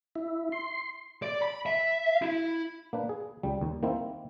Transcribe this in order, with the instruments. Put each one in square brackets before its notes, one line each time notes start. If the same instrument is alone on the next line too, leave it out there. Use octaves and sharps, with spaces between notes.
[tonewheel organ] E4
C6
[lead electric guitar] D5
B5
E5
E4
[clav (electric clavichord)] A#3 D4 B4
G#4
C#2 G3
D#2
D#3 A#3 C4 E4